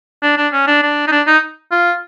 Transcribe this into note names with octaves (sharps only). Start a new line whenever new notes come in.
D4
D4
C#4
D4
D4
D#4
D4
D#4
F4